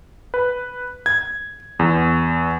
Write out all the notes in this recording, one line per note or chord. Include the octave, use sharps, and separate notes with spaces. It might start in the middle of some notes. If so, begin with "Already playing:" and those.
B4
G#6
E2